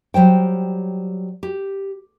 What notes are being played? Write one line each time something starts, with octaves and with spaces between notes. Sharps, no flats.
F#3 G3 C5 G5
G4